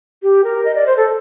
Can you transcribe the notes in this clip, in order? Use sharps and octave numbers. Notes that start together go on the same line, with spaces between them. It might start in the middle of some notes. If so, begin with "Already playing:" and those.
G4
A#4
D#5
D5
C5
A4